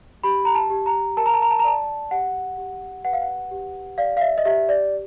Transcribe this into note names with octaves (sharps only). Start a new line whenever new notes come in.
G4 B5
A#5
A5
G4
A#5
A#4 A5
A#5
A5
A#5
A5
A#5
D5 A5
G4 F#5
G4
B4 F#5
F5
F#5
G4
D5 F5
F5
E5
D#5
G4 E5
D5